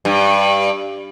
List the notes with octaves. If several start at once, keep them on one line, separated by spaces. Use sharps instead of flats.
G2